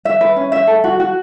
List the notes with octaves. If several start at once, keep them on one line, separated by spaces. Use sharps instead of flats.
E5
B4
C#4
E5
A4
F#4
F#4